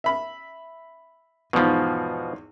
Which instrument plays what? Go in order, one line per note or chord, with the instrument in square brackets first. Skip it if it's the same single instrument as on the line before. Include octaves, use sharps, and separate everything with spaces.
[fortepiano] E5 B5
[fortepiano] E2 G#2 [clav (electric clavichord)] B2 F3